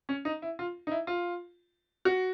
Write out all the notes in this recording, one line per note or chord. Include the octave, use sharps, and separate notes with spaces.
C#4
D#4
E4
F4
D#4
E4
F4
F#4